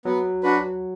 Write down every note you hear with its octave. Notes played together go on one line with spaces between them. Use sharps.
F#3 B3
D4 F#4 B4